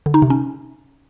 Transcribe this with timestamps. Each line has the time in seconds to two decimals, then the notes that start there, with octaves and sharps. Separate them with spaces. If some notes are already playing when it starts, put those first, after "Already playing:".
0.06 D3
0.14 D#4
0.22 C3
0.30 C#4